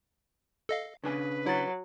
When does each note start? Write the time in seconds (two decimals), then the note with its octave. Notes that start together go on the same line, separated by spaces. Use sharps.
0.69 A4 D#5 F5
1.04 C#3 D4 B4 G#5
1.46 F#3 E4 A6